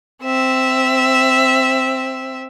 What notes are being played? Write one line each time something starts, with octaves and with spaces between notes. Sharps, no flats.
C4 E5